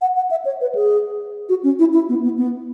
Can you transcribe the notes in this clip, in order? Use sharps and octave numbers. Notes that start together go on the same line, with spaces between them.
F#5
F#5
E5
C#5
B4
G#4
F#4
C#4
E4
E4
B3
B3
B3